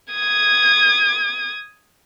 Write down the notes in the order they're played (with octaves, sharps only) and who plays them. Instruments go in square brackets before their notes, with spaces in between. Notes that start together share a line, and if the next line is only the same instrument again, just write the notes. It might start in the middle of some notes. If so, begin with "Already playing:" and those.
[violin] D#6 G#6